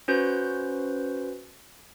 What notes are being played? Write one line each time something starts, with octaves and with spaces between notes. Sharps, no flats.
C#4 F#4 B4 C5 G6